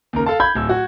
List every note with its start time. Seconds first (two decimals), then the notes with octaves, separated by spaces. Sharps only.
0.13 D#2 C#3 A#4
0.26 A4 F5 A5
0.40 B5 G6 G#6
0.55 D1 E6
0.69 F#4